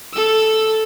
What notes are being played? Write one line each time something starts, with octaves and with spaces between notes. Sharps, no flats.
A4 E6